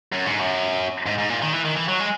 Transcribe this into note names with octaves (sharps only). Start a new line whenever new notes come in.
F#2
G#2
F#2
G#2
G#2
A#2
D#3
E3
D#3
E3
F#3
G#3